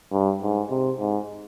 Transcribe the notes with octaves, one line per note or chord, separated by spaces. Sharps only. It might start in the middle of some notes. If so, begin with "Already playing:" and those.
G2
G#2
C3
G#2